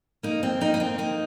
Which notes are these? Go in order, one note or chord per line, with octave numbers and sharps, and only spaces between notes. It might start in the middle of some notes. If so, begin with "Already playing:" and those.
A#3 D#4
C4
A#3 D#4
D#4
C4
A#3 D#4